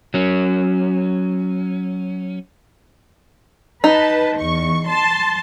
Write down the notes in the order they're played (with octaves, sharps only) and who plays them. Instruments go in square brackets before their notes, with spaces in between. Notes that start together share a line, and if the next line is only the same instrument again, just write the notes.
[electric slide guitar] F#3 C#4
[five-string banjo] D#4 [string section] B4 A5
[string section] E2 C#6
A5 C6